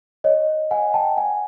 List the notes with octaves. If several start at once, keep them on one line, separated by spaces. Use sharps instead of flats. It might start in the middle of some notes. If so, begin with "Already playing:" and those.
C#5 D#5
F#5 G#5
G5 A5
F#5 G#5